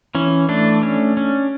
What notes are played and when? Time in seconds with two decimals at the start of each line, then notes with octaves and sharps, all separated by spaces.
0.15 E3 C#4
0.49 A3 D4
0.83 C#4
1.17 C#4